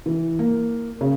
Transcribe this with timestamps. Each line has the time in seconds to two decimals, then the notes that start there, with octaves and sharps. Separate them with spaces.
0.06 E3
0.39 A#3
1.01 C#3